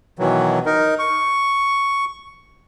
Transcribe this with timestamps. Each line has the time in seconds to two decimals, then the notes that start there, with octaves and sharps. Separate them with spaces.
0.19 B2 D#3 E3 F#3
0.66 D#4 A#4
0.99 C#6